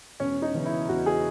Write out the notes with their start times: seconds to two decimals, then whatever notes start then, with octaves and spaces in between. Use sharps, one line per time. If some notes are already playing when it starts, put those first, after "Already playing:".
0.20 E1 C#4
0.42 D#4
0.54 E2 C#3 E3
0.66 E4
0.89 E1 F#4
1.06 G#4